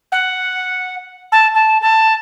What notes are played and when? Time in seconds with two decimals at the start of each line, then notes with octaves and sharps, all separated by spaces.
0.12 F#5
1.32 A5
1.54 A5
1.81 A5